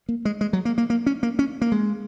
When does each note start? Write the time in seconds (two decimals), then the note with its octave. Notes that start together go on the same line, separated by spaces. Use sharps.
0.09 A#3
0.25 G#3
0.41 G#3
0.53 F#3
0.65 A#3
0.78 A#3
0.90 A#3
1.06 C#4
1.23 A#3
1.39 C#4
1.62 A#3
1.72 G#3